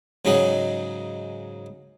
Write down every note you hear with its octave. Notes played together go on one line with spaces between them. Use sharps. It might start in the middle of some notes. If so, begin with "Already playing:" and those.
G#2 C#3 F#3 D#4 G#4 F#5